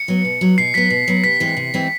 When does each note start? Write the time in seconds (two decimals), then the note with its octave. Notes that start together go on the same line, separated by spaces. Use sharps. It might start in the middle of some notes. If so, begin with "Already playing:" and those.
Already playing: C#7
0.08 F#3 B3
0.25 B2
0.41 F#3 B3
0.58 B2 C7
0.74 F#3 B3 B6
0.90 B2
1.08 F#3 B3
1.24 C3 B6
1.40 E3 G#3 C4
1.57 C3
1.74 E3 G#3 C4